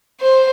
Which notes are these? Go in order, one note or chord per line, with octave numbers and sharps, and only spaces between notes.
C5